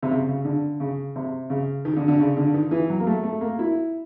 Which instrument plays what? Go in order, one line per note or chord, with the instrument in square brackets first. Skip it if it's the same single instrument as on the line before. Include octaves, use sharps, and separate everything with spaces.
[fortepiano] C3
C#3
C#3
D3
C#3
C3
C#3
D#3
D3
D3
C#3
D3
D#3
E3
F#3
A#3
A3
A3
A#3
E4